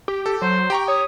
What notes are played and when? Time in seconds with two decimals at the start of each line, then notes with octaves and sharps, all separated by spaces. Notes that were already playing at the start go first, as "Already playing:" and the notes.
0.08 G4
0.26 A4
0.42 F#3 C5
0.70 G4 G5 A#5 C#6
0.88 C#5 D#6